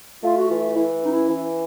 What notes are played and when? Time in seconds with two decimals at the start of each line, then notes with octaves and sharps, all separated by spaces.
0.24 A3 F4
0.36 F#4
0.48 E3 F4
0.76 E3 E4
1.02 C#4 D#4
1.12 E4
1.29 E3